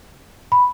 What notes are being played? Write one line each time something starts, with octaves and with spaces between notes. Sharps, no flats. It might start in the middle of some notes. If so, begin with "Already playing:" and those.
B5